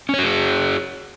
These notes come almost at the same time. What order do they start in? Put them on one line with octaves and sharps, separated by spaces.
C#4 C#5 F#4 G#4